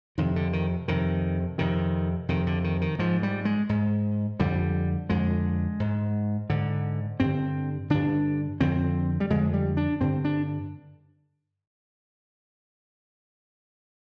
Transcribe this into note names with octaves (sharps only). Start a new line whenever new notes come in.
F2 C3 D#3
D3
D#3
F2 C3 D#3
F2 C3 D#3
F2 C3 D#3
D3
D#3
D#3
G#2 F3
G3
G#3
G#2
F2 D3 G3
F2 D3 G#3
G#2
G#2 D3
G2 D3 C4
G2 D3 D4
F2 D3 C4
G3
F2 D3 G#3
G3
D4
G2 D3 C4
D4